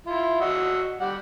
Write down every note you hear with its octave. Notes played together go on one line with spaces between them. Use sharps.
E4 F4
F#4 D#5 E6
G3 F#5